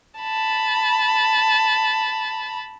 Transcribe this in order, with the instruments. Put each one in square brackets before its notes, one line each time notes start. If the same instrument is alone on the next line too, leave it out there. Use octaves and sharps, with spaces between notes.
[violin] A5 B5